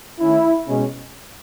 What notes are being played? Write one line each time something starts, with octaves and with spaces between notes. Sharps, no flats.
D#3 A3 C#4 E4
B2 G#3 C#4